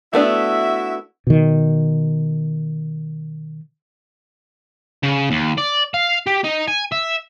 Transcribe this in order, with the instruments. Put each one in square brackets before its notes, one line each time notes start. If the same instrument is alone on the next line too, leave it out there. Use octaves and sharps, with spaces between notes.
[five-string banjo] A3 B3 D4 [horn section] E4 F#4 E5
[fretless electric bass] B2 D#3
[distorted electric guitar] C#3
D#2
D5
F5
G4
D#4
G#5
E5